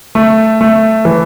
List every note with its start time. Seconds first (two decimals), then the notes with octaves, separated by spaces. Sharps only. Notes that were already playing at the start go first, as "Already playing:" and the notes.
0.15 A3
0.61 A3
1.05 E3